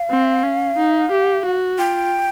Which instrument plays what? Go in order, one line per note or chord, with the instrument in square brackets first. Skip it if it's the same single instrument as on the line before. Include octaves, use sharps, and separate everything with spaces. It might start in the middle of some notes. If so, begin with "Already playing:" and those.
Already playing: [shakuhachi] F5
[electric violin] C4
C#4
D#4
G4
F#4
[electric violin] F4 [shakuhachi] G5